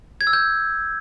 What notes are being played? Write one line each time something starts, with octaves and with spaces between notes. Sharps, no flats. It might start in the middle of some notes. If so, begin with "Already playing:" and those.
G#6
E6
G6